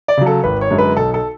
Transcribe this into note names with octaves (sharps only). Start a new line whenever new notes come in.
D5
C#3 F#3
A4
G#1 B4
C#5
F#2 D3 G#3
B4
B1 A4
A4